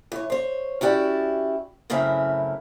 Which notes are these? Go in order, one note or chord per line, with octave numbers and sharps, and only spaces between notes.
E3 C#5
C5 C#5
C#4 E4 F#4 G4 D5
F#2 A2 C#3 C4 E4 A#4